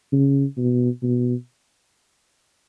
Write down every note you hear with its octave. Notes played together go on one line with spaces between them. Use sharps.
C#3
B2
B2